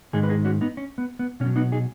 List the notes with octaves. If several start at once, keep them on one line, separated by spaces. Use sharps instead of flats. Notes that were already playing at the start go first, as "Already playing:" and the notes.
G#2 D#3 G#3 D#4 G#4
B4
D#4 G#4
C#4 F#4
B3 D#4
C#4
B3
B3
B2 C#4
F#3
B3 D#4
D#4 G#4